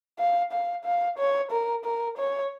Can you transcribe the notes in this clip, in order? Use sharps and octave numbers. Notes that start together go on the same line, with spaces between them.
F5
F5
F5
C#5
A#4
A#4
C#5